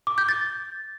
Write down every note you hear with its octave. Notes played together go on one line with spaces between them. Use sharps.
D6
G6
A6